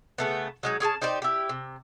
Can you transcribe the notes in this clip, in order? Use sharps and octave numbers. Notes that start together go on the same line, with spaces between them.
C#3 A3 B3
F#3 G#3 D#4
C#4 G#4 G5 A5
D#4 G4 C5 D5
E4 G4
C3